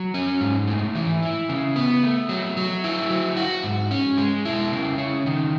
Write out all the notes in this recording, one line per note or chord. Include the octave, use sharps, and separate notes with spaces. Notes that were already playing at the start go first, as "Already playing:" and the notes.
Already playing: F#3
C#4
G#2
A3
E3
E4
C#3
B3
A3
F#3
F#3
E4
F#3
F#4
G#2
C#4
G#3
E4
C#3
C#4
D#3